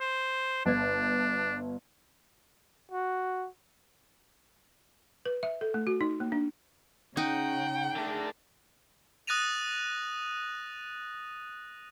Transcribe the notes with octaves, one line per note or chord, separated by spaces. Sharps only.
C5
G1 D4 G#6
F#4
B4
E5
A4
A3
F#4
D#4
A#3
D4
C#3 D#4 F#5 G5
D3 A3 D4 G#4 A#4
D#6 F#6 A6 A#6 D#7 F7